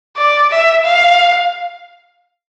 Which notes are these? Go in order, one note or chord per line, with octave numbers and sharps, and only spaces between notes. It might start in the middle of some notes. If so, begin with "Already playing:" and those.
D5
E5
F5